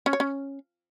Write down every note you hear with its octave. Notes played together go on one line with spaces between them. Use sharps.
C#4
C#5
C#4